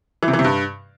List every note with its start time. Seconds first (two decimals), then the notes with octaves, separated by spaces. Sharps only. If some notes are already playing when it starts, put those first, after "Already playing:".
0.23 E3
0.28 C3
0.34 E3
0.39 C3
0.44 G2